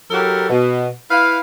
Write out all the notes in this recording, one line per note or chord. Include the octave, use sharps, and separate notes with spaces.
F#3 E4 G4 A4 A#4
B2
E4 B4 F5